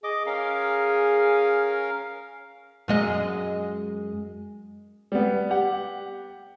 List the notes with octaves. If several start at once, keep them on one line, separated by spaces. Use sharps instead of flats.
G#4 D#5 D6
C#4 A#4 F5
F#2 G#3 D#5
G3 B3
G4 F#5